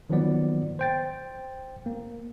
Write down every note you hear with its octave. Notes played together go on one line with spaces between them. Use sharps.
D#3 F3 F#3 A#3 B3 D5
C5 G5 A6
A#3